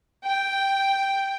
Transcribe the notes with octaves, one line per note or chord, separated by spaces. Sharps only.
G5